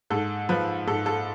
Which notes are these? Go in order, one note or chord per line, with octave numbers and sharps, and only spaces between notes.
G#2 A4
F3 B4
G#2 A4
A4